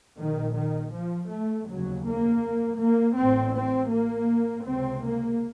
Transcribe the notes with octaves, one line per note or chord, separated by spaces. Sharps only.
A#1 A#2 D#3
D#3
F3
A3
F1 D#2 C#3 F#3
A#3
A#3
A1 A2 C4
C4
A#3
C#2 C3 C4
A#3